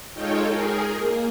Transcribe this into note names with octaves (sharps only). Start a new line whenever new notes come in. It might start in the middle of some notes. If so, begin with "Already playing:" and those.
G#3 D#4 F4 A4 C#5 G5
G#4 A#4
A#3